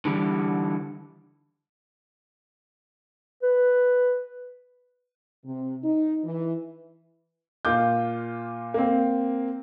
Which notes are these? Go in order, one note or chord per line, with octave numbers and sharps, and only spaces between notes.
D3 E3 G3
B4
C3
D#4
E3
A#2 F4 D6 G6
A#3 C4